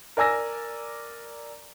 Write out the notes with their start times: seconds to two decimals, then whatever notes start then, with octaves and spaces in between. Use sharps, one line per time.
0.17 A#4 D5 G#5 E6 A#6